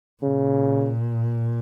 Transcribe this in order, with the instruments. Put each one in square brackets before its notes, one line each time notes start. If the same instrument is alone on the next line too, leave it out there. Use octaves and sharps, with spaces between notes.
[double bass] A#2 [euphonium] C#3